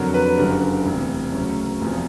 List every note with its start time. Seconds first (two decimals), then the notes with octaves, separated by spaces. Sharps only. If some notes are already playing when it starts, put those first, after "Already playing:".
Already playing: F2 D3 F#3 A#4
0.14 B4
0.37 F#1 F#2 D3 G3 A#4
0.85 E1 D2 C3
1.32 D2 C#3 F#3
1.80 E1 E2 C3 F3